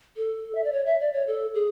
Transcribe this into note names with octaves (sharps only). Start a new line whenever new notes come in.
A4
E5
D5
C#5
E5
D5
C#5
A4
G#4